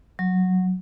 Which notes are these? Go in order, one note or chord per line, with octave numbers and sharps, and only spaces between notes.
F#3